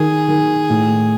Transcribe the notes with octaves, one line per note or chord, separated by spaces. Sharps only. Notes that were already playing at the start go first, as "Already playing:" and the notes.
Already playing: D#3 G#4
D#3
A2